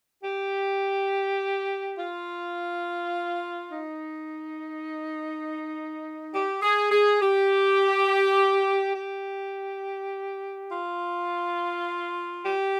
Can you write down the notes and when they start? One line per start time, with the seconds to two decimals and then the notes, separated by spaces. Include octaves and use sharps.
0.22 G4
1.96 F4
3.70 D#4
6.32 G4
6.62 G#4
6.91 G#4
7.20 G4
8.95 G4
10.69 F4
12.44 G4